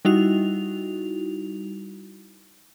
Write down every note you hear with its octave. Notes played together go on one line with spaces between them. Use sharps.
G3 D#4 E4 F#4 F7